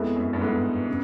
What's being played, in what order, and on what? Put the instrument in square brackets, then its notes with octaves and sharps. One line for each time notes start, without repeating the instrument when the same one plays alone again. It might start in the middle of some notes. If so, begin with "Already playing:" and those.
Already playing: [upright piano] F2 [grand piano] G#3 B3 E4 A4
[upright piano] F#2
G2
[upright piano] G#2 [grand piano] G#3 B3 E4 A4
[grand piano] C#3